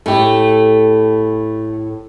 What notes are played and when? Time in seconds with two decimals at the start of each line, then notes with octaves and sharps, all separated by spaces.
0.06 A2 A3 G4